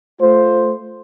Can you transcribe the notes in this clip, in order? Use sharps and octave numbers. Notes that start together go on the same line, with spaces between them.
A3 F4 C5